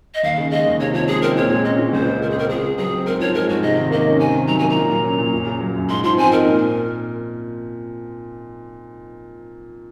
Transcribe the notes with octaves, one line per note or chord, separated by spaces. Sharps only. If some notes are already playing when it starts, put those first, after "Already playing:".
D#5
D#2 F5
C#3
G#3 D#5
D#2
C3 C#5
F3 C#5
G#3 G#4
C4 A#4
A#2 C#5
G#3
C#4 D#5
A#2
C#2 C5
C#3
G#3 A#4
G#4
C4 A#4
C#2 G#4
C#3
F#3 G#4
C4
G#2 A#4
F3 C#5
G#3 A#4
G#2 F#4
C3 D#5
D#3
A#3 D#5
C#4
C3 G#5
D#3
F#3 A#5
A#3 G#5
A#5
A#2
F#3
C#4
A#2
F#2
C#3
F#3
F#2
G#2 C6
F3 C6
C4 G#5
D#4 A#4
A#2